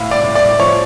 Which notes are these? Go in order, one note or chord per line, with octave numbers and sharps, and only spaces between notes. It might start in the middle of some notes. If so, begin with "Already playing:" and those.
Already playing: A2 F5
D5
A2
D5
F3 C#5